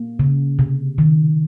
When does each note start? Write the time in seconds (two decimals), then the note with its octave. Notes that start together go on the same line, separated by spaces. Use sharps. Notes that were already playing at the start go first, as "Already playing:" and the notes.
Already playing: A#3
0.19 C#3
0.59 C3
0.98 D#3